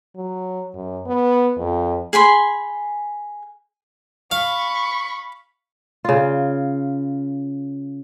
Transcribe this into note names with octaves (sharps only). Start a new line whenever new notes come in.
F#3
F#2
B3
F2
G#4 G#5 B5 C6
F5 B5 C#6
C#3 F4